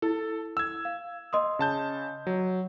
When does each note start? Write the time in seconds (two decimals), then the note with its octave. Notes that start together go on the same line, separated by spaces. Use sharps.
0.02 E4 A4
0.57 E6 G#6
0.85 F5
1.33 D#5 C6 D#6
1.59 C#3 A5 G6
2.27 F#3